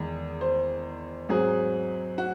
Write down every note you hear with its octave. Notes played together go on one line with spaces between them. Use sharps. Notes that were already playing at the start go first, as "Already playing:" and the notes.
Already playing: E2 D#3 G#3
C5
G#2 F#3 C4 G#4
F#4